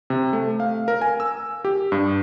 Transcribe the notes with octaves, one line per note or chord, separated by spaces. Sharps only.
C3
A3
F5
A#4
G#5
E6
G4
G2